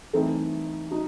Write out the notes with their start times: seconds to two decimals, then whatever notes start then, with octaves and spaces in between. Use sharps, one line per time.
0.13 E3 A3 C4 D#4 A4
0.91 D#4 F#4